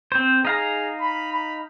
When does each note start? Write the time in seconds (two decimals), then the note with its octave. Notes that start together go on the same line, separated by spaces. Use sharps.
0.12 C4 C5
0.45 D#4 G#4 F5 A#5
1.01 B5
1.33 B5